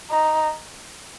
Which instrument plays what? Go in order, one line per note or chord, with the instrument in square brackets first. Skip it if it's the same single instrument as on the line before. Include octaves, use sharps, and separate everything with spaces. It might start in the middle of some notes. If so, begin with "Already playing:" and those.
[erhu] D#4